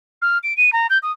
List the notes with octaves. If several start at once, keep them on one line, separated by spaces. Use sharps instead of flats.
F6
D7
D#7
A#5
G6
D#6